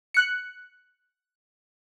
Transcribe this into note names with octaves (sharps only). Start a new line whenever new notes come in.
F#6 C#7